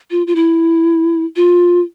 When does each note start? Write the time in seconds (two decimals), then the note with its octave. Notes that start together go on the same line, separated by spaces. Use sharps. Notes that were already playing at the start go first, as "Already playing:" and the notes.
0.11 F4
0.27 F4
0.35 E4
1.36 F4